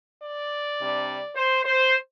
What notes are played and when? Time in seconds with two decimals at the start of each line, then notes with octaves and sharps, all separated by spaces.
0.22 D5
0.80 C3 G3 D4
1.36 C5
1.65 C5